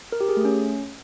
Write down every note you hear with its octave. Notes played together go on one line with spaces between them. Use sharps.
A#4
G4
G#4
A3
C#4